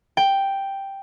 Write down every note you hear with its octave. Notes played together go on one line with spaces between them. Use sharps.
G5